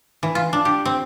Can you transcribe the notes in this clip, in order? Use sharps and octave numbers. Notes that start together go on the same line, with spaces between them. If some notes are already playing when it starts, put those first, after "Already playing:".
E3
F4
D4
G4
C4